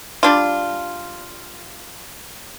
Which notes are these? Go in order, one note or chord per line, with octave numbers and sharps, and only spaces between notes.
G3 D4 F4